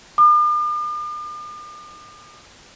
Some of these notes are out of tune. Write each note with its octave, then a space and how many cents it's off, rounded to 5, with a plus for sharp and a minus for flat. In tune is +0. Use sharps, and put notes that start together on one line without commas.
D6 +45